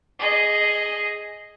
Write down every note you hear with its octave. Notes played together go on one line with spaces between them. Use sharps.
G#4 D#5